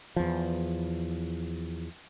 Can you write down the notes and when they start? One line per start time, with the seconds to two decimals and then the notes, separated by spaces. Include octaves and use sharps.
0.16 E2 F3